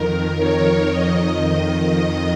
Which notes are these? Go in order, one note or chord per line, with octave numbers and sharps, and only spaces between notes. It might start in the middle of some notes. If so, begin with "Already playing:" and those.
Already playing: F2 D#3 A#4
C#5
F2 D#3 D#5